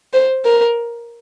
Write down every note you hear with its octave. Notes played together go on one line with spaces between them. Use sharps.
C5
A#4